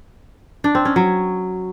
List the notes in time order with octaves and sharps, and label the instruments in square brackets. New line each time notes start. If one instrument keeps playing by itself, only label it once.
[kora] D4
C4
C#4
F#3